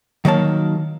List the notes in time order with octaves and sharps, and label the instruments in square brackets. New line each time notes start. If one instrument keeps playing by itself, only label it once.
[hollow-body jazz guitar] D#3 F#3 A#3 A5